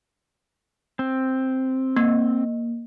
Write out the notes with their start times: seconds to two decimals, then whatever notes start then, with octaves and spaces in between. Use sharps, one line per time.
0.99 C4
1.96 A#3